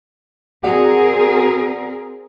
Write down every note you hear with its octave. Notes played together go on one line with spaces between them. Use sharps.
C4 F#4 G#4 A#4 D5 F#5